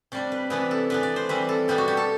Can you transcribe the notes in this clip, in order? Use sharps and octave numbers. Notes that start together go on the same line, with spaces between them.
C3 G3 D4 D5
B4
C3 E3 B3 D4 B4
A4
E3 B3 D4 B4
D5
C5
E3 G3 C4 B4
A4
B2 G3 B3 D4 G4
F#4
G4
A4